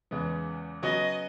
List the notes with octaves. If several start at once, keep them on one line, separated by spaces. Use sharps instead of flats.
E2 C#3 G#3 B3
C#3 F#3 B3 F#4 D#5